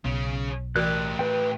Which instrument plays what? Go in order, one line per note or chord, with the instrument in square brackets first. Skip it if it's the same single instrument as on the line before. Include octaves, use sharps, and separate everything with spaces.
[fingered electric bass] B1 [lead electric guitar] C#3 C#4
[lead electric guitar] A2 G4 [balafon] E3 F#4 A#4 [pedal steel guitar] F#6
[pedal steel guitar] B4 G5